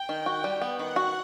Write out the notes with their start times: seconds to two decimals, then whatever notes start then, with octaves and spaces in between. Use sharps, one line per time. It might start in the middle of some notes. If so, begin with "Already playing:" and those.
Already playing: G5
0.09 D#3
0.26 F#4
0.44 G3
0.61 B3
0.79 D#3 F#5
0.96 F#4